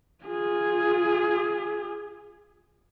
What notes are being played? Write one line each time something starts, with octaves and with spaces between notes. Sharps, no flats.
F4 G#4